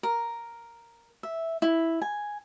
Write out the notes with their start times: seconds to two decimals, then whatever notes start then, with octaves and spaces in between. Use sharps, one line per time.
0.03 A#4
1.23 E5
1.62 E4
2.02 G#5